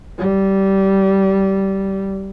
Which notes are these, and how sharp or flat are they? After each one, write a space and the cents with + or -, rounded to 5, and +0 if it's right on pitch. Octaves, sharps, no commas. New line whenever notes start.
G3 -15